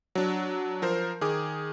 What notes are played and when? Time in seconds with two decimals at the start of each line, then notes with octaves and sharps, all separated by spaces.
0.15 F#3 D4
0.82 F3 A#4 C5
1.21 D#3 G#4 D6